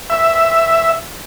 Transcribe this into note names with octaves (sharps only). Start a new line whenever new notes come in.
E5